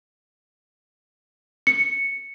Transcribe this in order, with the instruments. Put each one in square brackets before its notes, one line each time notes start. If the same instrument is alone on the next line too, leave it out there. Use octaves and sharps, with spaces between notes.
[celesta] C#7